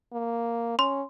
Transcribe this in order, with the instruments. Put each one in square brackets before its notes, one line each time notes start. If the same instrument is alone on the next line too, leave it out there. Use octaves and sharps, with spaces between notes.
[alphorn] A#3
[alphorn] C#4 [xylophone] C6